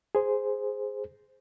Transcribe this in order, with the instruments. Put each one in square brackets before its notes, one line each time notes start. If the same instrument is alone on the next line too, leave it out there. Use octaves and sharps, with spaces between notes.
[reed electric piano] G#4 C5